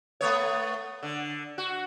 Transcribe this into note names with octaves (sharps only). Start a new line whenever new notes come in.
A3 B3 C#5
D3
F#4